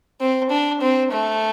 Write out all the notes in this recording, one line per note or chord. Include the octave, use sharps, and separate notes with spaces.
C4
D4
C4
A3